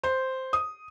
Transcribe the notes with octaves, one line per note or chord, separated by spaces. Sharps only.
C5
D#6